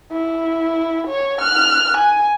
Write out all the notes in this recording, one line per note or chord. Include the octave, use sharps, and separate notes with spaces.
E4
C#5
F6 F#6
G#5